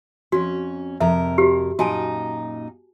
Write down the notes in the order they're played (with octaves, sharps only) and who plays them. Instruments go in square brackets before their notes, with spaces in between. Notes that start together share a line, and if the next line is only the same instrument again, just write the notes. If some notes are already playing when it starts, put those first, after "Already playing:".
[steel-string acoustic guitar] F2 C#4 [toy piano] F#4
[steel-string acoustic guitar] F2 C3 A#4 [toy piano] E5
[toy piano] F#4 G4
[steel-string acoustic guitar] F#2 A#2 D#4 [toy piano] F#4 G#5 A5